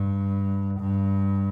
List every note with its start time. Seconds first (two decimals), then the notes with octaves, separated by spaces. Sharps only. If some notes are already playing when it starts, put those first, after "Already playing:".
Already playing: G2
0.79 G2